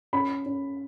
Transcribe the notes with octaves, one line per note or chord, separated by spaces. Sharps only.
C#4 B5
C#4